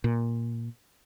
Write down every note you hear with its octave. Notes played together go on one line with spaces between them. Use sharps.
A#2